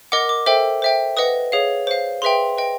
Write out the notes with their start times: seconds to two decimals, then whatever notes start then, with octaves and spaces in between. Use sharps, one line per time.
0.12 A#4 D#5 F#5 D6
0.29 D6
0.46 A4 C5 E5 G5
0.82 C5 E5 G5
1.17 B4 D#5 F#5 D#6
1.52 G#4 C#5 F5
1.87 C5 F5
2.22 G#4 B4 E5 G5 C6
2.58 B4 D#5 G5